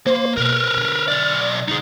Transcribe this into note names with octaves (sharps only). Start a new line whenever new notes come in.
A#3 C5
B2 A#4 B4 F6
D3
B1 D5
D3 D#4 E4 G#4